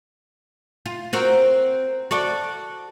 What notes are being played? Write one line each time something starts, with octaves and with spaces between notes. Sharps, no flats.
F4
C4 F#4 A#4
F#4 A4 D5